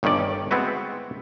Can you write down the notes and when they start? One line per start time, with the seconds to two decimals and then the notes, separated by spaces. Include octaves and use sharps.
0.03 G1 G2 D#3 C#4 D5
0.51 G#3 B3 C4 E4 F#4 B4